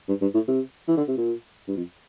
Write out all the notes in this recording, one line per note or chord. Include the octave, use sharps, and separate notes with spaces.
G2
G2
A2
C3
E3
D3
C3
A#2
G2
F2